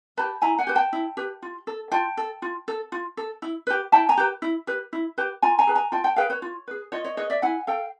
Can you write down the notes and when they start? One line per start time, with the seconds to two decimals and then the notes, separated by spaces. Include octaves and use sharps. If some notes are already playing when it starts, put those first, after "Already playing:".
0.17 G4 B4 A5 B5
0.42 E4 G#5 A#5
0.58 F#5 G#5
0.67 G4 B4
0.75 G5 A5
0.93 E4
1.17 G4 B4
1.42 F4
1.67 A4
1.92 F4 G5 A5
2.17 A4
2.42 F4
2.68 A4
2.92 F4
3.17 A4
3.42 E4
3.67 G4 B4
3.92 E4 G5 A5
4.09 G#5 A#5
4.17 G4 B4
4.42 E4
4.67 G4 B4
4.93 E4
5.18 G4 B4
5.42 F4 G#5 A#5
5.59 G#5 A#5
5.67 G#4 B4
5.75 G#5 A#5
5.92 F4 G5 A5
6.04 G5 A5
6.16 G#4 B4 F5 G5
6.30 B4 C#5
6.42 F4
6.68 G#4 B4
6.92 F4 C#5 D#5
7.04 C#5 D#5
7.17 G#4 B4 C#5 D#5
7.30 D5 E5
7.42 E4 F#5 G#5
7.67 A4 F5 G5